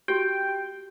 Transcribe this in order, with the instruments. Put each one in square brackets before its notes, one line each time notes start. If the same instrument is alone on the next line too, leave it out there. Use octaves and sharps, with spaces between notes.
[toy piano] F#4 G4 [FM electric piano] G5